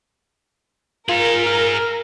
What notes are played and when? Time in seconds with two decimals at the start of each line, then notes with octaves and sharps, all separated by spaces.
1.09 F4 G#4 A#4 A#5
1.46 F6